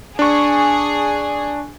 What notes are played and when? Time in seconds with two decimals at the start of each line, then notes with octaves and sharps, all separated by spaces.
0.19 D4 G#4 C#6